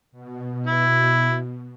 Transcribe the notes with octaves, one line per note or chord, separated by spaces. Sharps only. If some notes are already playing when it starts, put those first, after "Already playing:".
B2
E4